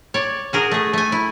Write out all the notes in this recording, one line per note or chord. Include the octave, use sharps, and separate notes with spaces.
C#5 D5
F#4 G#4 A#4
A3 G#4
A3 G#5
E4